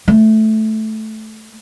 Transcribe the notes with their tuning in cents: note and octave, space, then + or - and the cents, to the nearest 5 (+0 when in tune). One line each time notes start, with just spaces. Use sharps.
A3 -10